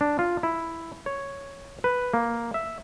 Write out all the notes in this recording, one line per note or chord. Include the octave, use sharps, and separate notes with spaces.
D4
F4
E4
C#5
B4
A#3
E5